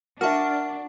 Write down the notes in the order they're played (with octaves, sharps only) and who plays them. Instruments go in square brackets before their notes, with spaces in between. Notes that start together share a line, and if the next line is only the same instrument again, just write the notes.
[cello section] D4 [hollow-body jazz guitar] F#4 [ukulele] A#4 E5 [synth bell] A5 F6